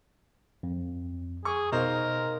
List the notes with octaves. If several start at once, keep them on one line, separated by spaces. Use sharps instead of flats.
F2
G#4 C#6
B2 D#4 A#4 C5 F5